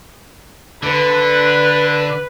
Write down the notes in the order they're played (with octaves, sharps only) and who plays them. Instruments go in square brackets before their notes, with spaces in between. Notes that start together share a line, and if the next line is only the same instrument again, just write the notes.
[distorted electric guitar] D3 [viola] B4